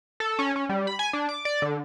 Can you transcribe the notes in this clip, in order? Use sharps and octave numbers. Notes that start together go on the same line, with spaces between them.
A4
C#4
C#4
G3
B5
G#5
D4
D6
D5
D3